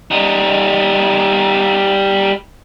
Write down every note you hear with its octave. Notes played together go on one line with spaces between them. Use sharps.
G3 D#4